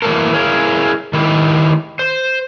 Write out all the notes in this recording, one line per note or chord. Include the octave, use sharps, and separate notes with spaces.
E3 F#3 A3 A#3 A4 A#4
E4 G#4 A#4 C#5 F5
D#3 E4 G4
C5